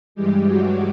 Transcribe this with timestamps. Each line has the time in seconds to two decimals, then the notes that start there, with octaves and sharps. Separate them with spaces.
0.15 G2 E3 G3 G#3 G4
0.47 F#3 F#4